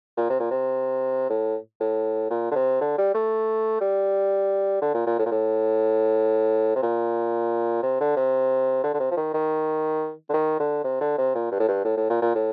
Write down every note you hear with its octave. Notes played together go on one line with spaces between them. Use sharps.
A#2
C3
A#2
C3
A2
A2
A#2
D3
C3
D3
G3
A3
G3
D3
A#2
A#2
A2
A#2
A2
C3
A#2
C3
D3
C3
D3
D3
C3
F3
D#3
D#3
D3
D#3
D3
C3
D3
C3
A#2
G2
A2
G2
A2
A2
A#2
A#2
A2